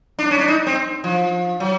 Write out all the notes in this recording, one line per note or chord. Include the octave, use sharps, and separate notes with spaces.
D4
C#4
D4
D#4
C4
F3
F#3